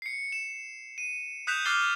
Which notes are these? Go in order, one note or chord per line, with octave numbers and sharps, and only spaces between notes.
C7 C#7
E7
D#7
D#6 F#6 G6 B6 E7 F7
D6 F6 F#6 A6 C7 G7